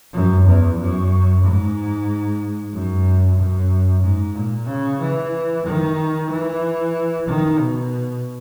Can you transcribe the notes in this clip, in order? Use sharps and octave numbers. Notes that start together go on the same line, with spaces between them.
F#2
E2
F#2
G#2
F#2
F#2
G#2
A#2
C#3
E3
D#3
E3
D#3
B2